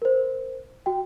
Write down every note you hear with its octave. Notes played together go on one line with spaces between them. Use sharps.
A#4 C5
F#4 G5